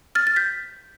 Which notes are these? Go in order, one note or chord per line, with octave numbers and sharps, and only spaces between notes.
F6 A6
A6
G6 B6